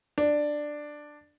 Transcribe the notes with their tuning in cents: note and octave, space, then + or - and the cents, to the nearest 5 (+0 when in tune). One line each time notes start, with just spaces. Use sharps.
D4 +10